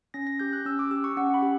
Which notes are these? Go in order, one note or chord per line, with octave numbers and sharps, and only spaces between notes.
C#4 A#6
A#6
G4 G6
F#6
C#4 E6
D6
G4 E6
C#6
C#4 F#5
B5
G4